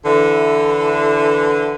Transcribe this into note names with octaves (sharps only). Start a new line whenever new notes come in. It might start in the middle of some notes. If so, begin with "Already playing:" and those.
D3 E3